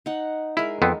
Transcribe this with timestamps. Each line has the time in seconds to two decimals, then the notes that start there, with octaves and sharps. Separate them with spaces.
0.06 D#4 F#5
0.57 G#3 E4 A#4
0.82 F2 B3 C4